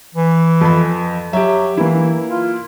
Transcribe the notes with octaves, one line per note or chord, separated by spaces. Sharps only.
E3
F2 B5
F#3 G4 E5
E3 A#3 E4
F4